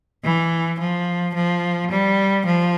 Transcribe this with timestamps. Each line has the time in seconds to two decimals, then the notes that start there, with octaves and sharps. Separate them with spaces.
0.24 E3
0.79 F3
1.34 F3
1.90 G3
2.46 F3